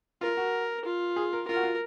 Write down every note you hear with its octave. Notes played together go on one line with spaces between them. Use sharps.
F4 A#4
F#4
F4
G#4
A#4
F4 A#4
F#4
F4